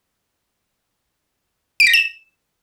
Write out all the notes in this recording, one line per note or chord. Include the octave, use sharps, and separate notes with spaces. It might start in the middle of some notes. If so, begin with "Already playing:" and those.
D7
A#6
E7